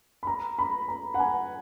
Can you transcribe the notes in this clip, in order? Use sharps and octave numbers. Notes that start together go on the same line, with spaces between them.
B5
A#5
B5
A#5
F#5
G#5